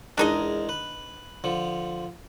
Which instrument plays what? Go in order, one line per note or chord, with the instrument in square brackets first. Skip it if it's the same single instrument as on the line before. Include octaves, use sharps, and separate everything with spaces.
[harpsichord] E2 G#3 A#4 [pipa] D4 D#4 D#5
[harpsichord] B4
D3 F3